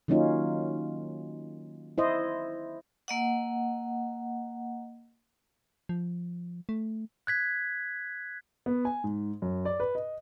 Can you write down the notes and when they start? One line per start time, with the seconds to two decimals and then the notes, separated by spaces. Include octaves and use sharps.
0.08 D#3 F#3 A#3 C#4 D#4 F4
1.98 E4 C5 D#5
3.08 A#3 D#5 F#5
5.89 F3
6.69 A3
7.27 F#6 G#6 B6
8.66 B3
8.85 G#5
9.04 G#2
9.42 F#2
9.65 D5
9.80 B4
9.95 D#5